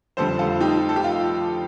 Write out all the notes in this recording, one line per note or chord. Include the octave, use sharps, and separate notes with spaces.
F1 F2 D3 G3 A4 C5
F4 A4
D#4 G4
A4
G4
F4